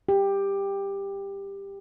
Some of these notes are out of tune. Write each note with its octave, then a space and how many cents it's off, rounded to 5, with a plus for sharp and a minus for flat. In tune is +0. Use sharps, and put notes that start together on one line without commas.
G4 +15